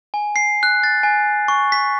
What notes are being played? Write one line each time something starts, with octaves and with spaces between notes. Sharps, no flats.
G#5
C7
F#6
A6
G#5
C#6
B6